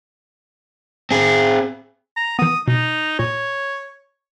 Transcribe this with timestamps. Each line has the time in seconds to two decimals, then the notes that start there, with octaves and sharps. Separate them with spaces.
1.11 C4 G#4
2.16 A#5
2.39 E3 B3 D#6
2.68 B2 D#4
3.19 A#2 C#5